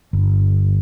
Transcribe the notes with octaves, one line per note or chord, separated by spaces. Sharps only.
G1